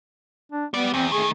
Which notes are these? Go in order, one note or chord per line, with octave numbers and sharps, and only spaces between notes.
D4
G3 B3 D5
E2 C4
D#3 A3 G#4